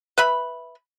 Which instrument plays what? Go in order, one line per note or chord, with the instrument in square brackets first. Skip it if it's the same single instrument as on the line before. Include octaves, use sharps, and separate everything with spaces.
[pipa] B4 E5 B5